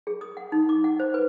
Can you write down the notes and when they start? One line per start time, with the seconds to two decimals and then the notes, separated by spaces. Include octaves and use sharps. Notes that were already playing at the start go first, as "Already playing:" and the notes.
0.07 G#4
0.21 D#6
0.37 F#5
0.52 D#4
0.69 D6
0.84 F#5
1.00 C5
1.14 B4